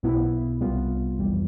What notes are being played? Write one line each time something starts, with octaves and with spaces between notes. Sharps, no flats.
B1 B2 B3 E4
C2 C3 G3 B3 F4
G1 F2 E3 G3